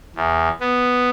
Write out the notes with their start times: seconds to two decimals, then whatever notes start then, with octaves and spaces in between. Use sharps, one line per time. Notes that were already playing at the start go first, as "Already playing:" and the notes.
0.16 E2
0.61 B3